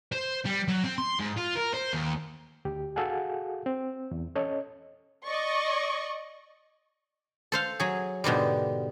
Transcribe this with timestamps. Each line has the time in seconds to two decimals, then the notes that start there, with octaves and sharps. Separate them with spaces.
0.12 C5
0.45 G3
0.68 F#3
0.84 C4
0.98 C6
1.19 G#2
1.37 F4
1.56 A#4
1.73 C5
1.93 D#2
2.65 D2 G4
2.96 F#4 G#4 A4 F5 F#5 G#5
3.66 C4
4.11 E2
4.36 C#4 A4 C#5 D#5
5.25 D5 D#5 C#6
7.52 A4 C5 F5
7.80 F#3 G#4
8.24 G#2 B2 D3 G3